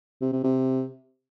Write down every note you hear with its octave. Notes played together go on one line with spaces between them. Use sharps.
C3
C3
C3